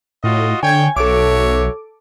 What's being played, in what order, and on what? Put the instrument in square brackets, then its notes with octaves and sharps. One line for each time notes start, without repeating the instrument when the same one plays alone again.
[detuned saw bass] A2 [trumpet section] F4 F#4 D#5
[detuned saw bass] D3 [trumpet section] C#5 G5 [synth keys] G#5 G#6
[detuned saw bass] B1 [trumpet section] F#4 C#5 E5 [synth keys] A4 D6